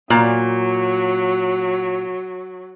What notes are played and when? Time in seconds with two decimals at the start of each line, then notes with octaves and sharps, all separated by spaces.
0.10 A#2 F#3